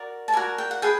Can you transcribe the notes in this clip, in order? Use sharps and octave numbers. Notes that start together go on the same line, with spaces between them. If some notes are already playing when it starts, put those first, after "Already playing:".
Already playing: F#4 A#4 D5
A5
F#4 A#4 D5 G#5
G5
F#5
G#4 B4 G5